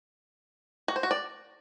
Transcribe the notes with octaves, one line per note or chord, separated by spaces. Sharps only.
F#4
C5
F#4
D5